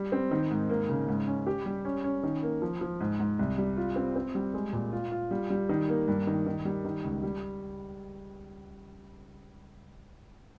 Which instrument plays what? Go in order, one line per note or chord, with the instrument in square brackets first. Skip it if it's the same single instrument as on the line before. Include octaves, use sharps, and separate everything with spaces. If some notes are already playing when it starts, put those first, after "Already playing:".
Already playing: [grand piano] G3
C4
D#3
G#2
A#3
C#3
G#2
C#4
G4
G3
C#4
C#4
D#3
A#3
F3
F3
G#2
G#2
C2
G3
F4
C4
C4
G3
G#3
A#2
F4
F4
G3
G3
D#3
A#3
G2
D#3
D#3
G3
D#3
C#2
G3